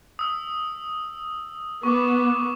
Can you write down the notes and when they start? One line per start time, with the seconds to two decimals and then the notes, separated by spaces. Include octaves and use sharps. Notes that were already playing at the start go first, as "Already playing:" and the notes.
0.19 D#6 E6
1.83 B3 C#6 D6